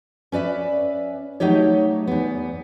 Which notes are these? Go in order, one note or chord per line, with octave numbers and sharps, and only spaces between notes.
C#4 B4 D5 E5
F#3 A3 D#4 G4 C#5
E2 B3